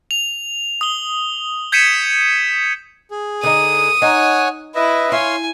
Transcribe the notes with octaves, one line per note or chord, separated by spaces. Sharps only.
F7
D#6 G7
G6 G#6 B6 C#7 D#7 E7
G#4
D3 D#4 D#6
D#4 C#5 F#5 G#5
E4 B4 D#5 E5
E4 C#5 F5 G#5 C6